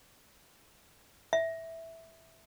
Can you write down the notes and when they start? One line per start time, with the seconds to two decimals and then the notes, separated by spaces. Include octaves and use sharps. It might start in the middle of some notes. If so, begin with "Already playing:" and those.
1.33 E5